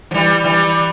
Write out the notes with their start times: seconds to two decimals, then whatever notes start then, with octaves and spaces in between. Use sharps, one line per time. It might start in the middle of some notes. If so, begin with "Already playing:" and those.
0.11 F3
0.14 E3 G3
0.44 E3 G3